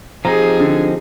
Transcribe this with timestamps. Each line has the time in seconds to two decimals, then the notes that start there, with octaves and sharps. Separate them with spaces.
0.25 F3 C4 D#4 G4 G#4 A#5
0.60 D3